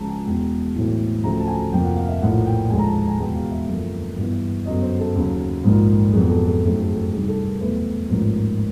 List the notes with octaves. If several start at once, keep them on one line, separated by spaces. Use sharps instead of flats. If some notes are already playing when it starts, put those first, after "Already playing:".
Already playing: C#2 C#3 F3 A5 A#5
G#5
E2 B2 G#3 G5
B1 A2 E3 A3 C4
D2 C#3 F3 A3 C4 A#5
A5
G#5
F2 C3 F3 A#3 G5
F#5
F5
E5
A#1 A2 F3 A#3 F#5
G5
D#2 D3 F3 G#3 G#5
A#5
A5
A5
G#5
E2 B2 G#3 B3 G5
F5
E5
F#2 D3 F3 A#3
G2 E3 G3 B3
F#2 D3 F#3 B3 D#5
C5
A4
D#2 C#3 F#3
A#1 G#2 F3 A#3
F2 D3 F#3 B3 G#4
A4
A4
F#2 D#3 F#3 A3 C4 G#4
A4
G#4
A4
C2 C3 D#3 G3 G#4
A4
A#4
E2 B2 F#3 A3 C4 B4
A1 G#2 F3 A#3